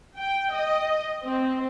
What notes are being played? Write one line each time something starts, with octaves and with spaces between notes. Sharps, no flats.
G5
D#5
C4